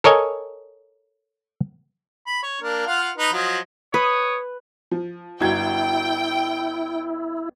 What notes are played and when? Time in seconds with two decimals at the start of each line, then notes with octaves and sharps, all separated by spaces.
0.04 A4 A#4 C#5 D#5 G#5
2.27 B5
2.43 C#5
2.61 A#3 D4 A#4
2.86 F4 F5 F#5
3.17 D#4 B4
3.33 F3 F#3 D#5
3.94 B4 C#5 D#6
4.91 F3
5.41 G1 E4 F#4 G5 G#6